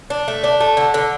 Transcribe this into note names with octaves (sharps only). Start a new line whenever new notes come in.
D4
A3
D4
A3
D3
D3